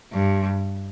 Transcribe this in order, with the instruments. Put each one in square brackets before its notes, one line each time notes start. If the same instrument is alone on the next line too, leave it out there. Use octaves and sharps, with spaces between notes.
[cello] G2